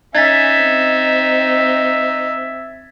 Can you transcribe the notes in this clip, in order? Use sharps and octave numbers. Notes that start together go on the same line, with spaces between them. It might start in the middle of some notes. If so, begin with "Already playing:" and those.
C#4 D#4 E5 G#5 G#6 A6 B6
C4